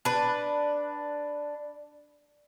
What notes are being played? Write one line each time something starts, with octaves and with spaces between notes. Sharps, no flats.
D4 B4